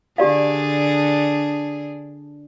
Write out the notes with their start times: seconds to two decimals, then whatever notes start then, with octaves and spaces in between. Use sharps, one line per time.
0.18 D3 D4 G4 G#4 D5 F5